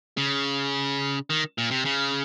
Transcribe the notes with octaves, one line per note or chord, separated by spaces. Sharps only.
C#3
D#3
A#2
C3
C#3